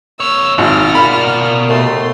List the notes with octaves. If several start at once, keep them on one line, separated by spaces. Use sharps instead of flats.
A#3 C#5 E6
G#1 B2 F4 F#5 F6
A#2 B5
D#2 A3 C6